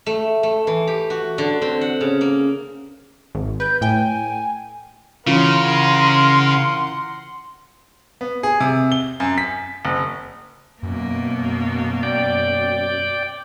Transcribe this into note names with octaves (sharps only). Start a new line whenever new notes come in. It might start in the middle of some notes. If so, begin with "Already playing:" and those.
A3
A3
E3
G4
F#4
D3
C4
F#5
C#3
A#3
G#1
B4 G6
A2 G5 G#5
C#3 E3 C#4 F4 A#4 F#5 C6
B3
G#4
C3
G7
F#2
B6
F#1
F#2 B2 A#3
D5 G5